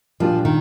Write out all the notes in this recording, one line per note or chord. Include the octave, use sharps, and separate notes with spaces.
A#2 F3 G3 D4 F4
D#3